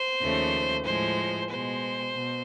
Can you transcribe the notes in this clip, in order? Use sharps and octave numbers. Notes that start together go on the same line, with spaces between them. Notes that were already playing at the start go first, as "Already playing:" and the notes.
Already playing: C5
D#2 C#3 F3 A3
A2 F3 G#3 C5
B2 G#3 C5
B2